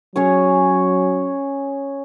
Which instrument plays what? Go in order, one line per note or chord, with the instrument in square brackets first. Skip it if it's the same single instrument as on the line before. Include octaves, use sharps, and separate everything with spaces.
[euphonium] F#3 [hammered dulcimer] C#4 G#4 C#5